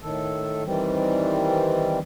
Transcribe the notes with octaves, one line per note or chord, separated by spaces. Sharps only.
A2 D#3 A4
D#3 E3 G3 C4